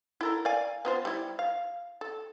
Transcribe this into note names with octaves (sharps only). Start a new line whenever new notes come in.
E4 A4 A#4
D5 F5 G#5
B3 F4 C5
G3 E4
F5
A4